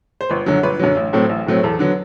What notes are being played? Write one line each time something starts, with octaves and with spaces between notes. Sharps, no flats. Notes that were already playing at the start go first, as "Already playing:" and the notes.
C5
G1 B4
F#2 D3 F#3
G1 B4
F#2 D3 F#3
A1
A2 F#3 A3 C4
A1
A2 F#3 A3 C4
E2 A4
D3 F#3 B3